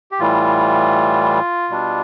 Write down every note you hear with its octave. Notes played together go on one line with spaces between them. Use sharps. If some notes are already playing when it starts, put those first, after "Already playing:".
G4
A2 E3 G3 F4
B2 G3 D4